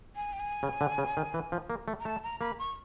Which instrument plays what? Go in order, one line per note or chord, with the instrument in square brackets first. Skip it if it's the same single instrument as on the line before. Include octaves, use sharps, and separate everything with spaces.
[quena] G#5
G5
G#5
[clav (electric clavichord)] C#3
D3
C#3
D#3
E3
F3
A#3
A3
[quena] A#5
[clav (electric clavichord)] A3 [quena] A5
[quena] A#5
[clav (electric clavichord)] A#3 [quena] B5
[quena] C#6